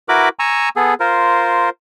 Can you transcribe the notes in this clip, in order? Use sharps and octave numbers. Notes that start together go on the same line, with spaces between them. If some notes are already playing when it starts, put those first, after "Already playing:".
E4 F#4 A#4 B4 B5 D6
G#5 A#5 C#6 E6
B3 G#4 A4
F4 A#4 C5